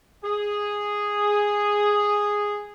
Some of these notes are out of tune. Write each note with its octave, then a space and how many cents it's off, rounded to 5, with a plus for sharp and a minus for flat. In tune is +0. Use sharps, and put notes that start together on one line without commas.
G#4 -5